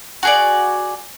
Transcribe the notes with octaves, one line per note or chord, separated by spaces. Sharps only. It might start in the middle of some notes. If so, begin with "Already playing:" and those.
F#4 G#4 D5